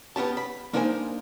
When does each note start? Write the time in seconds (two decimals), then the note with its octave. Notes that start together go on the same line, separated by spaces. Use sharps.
0.16 B3 C#4 G4 A5
0.37 B5
0.73 A#3 D4 D#4 A#4 C5 G#5